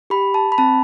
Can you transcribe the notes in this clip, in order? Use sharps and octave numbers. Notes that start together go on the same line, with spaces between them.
G4 B5
A5
B5
C4 A5